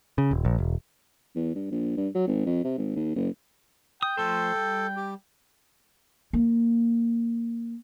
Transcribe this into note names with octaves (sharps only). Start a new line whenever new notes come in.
C#3
D#1
A#1
E1
E2
G2
A#1
G2
F#3
G#1
F2
C3
G#1
D#2
F#1
G5 D#6
F3 A3 A4 C5
G3
G4
A#3